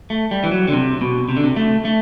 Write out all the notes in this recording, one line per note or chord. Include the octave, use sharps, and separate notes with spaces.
A3
G3
E3
F#3
D3
C3
B2
C3
D3
C3
A3
A3